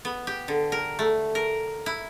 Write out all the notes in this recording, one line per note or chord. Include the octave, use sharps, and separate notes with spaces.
B3
G4
D3
A#4
A3
A#4
E4